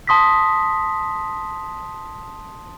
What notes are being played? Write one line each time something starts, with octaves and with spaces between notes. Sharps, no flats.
A5 C6 D#6 A#6 B6